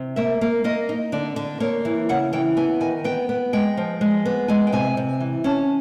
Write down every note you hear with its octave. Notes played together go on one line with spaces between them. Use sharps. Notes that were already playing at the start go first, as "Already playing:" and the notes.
Already playing: C3
A#3 E5
A#3
A#3 D#5
D#4
D3 D5
D3
A#3 C#5
E3
C#3 F#5
E3 G5
B3 G#5
D#3 G#5
B3 G5
B3
G#3 G5
F3
G#3
B3
G#3 G#5
G5
C3 G#5
C3
E3
C#4 A5